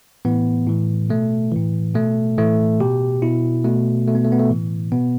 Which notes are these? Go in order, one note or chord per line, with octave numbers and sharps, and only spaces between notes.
A2 E3 B3
A2 E3
B2 A3
A2 E3
B2 A3
A2 E3 A3
B2 G4
B2 E4
B2 A3
B2 A3
B3
A3
B3
A3
A2 E3
B2 B3